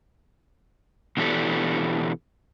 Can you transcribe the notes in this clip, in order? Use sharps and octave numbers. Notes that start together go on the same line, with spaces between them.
B2 E3 G#3 D4 G4 A4